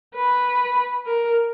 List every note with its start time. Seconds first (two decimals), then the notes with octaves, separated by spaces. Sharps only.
0.15 B4
1.07 A#4